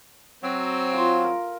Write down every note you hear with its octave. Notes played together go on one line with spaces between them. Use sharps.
F#3 C4
F4
A#4